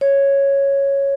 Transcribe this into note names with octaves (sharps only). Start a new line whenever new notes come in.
C#5